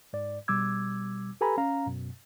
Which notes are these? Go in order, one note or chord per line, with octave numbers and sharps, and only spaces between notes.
G#2 D5
B2 G3 D6 E6 G#6
G4 A4 B4 G#5 A#5 B5
C#4 F5 A#5
F#2 B2